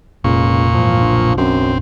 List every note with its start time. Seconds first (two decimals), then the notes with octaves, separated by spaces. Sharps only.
0.24 F1 C#2 A#2 C#6
0.74 F2 G#2 E3 F3
0.98 F#1 B1 D4
1.38 F#2 C4